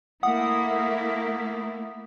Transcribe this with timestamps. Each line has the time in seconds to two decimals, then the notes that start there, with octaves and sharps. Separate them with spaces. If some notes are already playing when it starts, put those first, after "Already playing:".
0.23 A3 A#3 E4 F#5 D#6